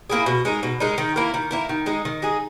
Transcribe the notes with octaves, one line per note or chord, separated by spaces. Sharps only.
A#3 E4 G#4
B2
G#3 D#4 A#4
B2
G#3 D#4 A#4
D#3
A#3 E4 A#4
D#3
A#3 E4 A#4
D#3
G#3 D#4 G#4
D#3
G#3 D#4 G#4